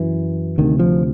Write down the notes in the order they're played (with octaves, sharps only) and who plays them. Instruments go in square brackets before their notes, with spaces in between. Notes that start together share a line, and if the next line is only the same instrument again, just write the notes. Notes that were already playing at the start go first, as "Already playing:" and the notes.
Already playing: [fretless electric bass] F#2 E3
D2 C3 D#3
F3